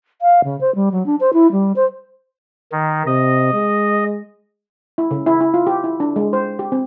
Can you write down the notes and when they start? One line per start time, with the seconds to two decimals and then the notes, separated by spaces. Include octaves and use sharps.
0.22 F5
0.44 C#3
0.61 C5
0.75 G3
0.92 F#3
1.06 D4
1.20 C5
1.33 E4
1.52 G3
1.76 C5
2.72 D#3
3.07 C3 D#5
3.54 G#3
4.98 E4
5.11 C#3
5.26 E4
5.41 E4
5.54 F4
5.67 G4
5.84 E4
6.00 D4
6.16 G#3
6.33 C5
6.59 G4
6.72 C4